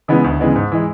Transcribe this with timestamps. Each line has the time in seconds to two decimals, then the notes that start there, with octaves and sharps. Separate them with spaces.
0.08 C#3 E3 G#3 B3
0.24 D2
0.40 C#3 E3 G#3 B3
0.55 G#2
0.72 E3 G#3